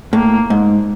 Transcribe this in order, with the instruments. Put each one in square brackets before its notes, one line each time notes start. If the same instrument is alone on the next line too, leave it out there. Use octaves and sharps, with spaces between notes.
[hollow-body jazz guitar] A2 [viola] A#3
[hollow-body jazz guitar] G#2